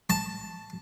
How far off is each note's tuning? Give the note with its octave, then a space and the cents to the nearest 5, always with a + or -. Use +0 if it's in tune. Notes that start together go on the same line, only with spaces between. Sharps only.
A5 +0